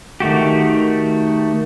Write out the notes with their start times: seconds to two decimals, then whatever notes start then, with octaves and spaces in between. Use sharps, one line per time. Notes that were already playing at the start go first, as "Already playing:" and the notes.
0.20 D#3 A3 F#4 G4